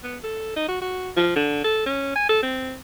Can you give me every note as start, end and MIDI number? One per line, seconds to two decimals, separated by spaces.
0.04 0.18 59
0.24 0.56 69
0.57 0.67 63
0.68 0.79 66
0.82 1.10 66
1.17 1.32 53
1.36 1.62 50
1.64 1.84 69
1.86 2.12 61
2.16 2.26 80
2.29 2.41 69
2.43 2.78 60